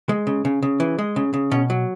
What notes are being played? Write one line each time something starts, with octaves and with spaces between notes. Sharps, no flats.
G#3
C#3
C#3
C#3
E3
G#3
C#3
C#3
B2 C#4
F#3